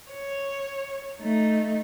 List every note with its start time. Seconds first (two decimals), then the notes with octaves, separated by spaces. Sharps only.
0.10 C#5
1.20 A3 D#4